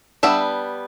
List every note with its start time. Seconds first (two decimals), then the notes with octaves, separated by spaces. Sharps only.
0.23 G3 B3 D4 E5